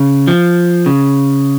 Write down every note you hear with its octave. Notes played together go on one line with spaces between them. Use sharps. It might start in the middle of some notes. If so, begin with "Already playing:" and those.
Already playing: C#3
F3
C#3